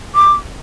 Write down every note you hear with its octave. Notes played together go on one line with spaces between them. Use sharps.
D6